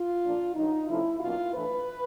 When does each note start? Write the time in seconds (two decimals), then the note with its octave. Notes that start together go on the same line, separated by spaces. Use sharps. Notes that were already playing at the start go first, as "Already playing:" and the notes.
Already playing: F4
0.23 A#2 F3 A#3 D4
0.55 G2 D#3 F#3 D#4
0.87 C3 F3 A3 C#4 E4
1.20 B2 F#3 A#3 C#4 F4
1.53 A2 E3 A3 D4 B4